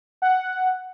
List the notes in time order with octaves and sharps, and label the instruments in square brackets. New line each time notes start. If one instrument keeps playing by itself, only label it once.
[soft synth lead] F#5